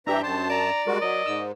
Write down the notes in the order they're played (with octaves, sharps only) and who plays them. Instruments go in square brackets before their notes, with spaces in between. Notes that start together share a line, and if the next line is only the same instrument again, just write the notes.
[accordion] G2 E3 E5 [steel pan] D4 G4 G5 [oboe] A#5
[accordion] F#2 A5 [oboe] C5
[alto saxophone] D5 [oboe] A#5
[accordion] G3 G#3 F#4 [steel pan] A#4
[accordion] F#3 [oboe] D#5
[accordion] G#2 [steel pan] E6